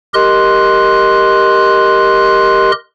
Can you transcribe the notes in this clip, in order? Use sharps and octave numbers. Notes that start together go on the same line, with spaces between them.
G4 A#4 D#5 C6 F#6